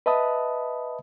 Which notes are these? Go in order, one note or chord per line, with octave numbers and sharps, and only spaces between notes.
B4 D#5 E5 A5 B5 D#6